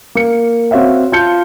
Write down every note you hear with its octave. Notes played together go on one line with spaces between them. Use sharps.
A#3 C#7
C4 F#4 C#5 E5 F5
F4 F5 A5 G6 C#7 G7